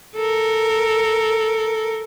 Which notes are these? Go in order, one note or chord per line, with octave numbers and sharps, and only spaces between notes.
A4 A#4